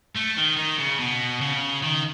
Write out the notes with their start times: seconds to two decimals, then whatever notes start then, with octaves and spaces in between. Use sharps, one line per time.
0.15 A3
0.37 D#3
0.57 D#3
0.79 C#3
0.99 B2
1.41 C#3
1.83 D#3